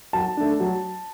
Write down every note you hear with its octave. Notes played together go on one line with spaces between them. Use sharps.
F#3 A5
A3 D4
F#3